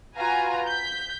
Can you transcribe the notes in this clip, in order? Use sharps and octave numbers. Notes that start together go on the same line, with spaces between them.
F4 F#4 B4 G#5 A#5
G6 B6